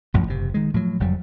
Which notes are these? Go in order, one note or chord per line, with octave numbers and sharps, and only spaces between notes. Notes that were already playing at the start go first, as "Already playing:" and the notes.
A1 F#2 F3
F#1 C3
D#3 G#3
A2 F3 F#3
F#1 F2 F#3 G3